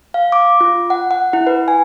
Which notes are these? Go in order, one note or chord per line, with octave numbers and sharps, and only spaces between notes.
F5
D6
F4
F#5
F#5
E4
B4
G#5